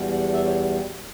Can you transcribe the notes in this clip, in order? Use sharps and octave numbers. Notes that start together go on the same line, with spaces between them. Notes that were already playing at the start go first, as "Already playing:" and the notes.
Already playing: E2 B2 G3
F#5
E5
C#5